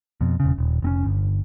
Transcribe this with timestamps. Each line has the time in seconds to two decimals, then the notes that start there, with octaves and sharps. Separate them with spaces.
0.21 F2 B2
0.40 E1 C#3
0.58 D#1
0.82 F1 C4 C#4
1.05 G1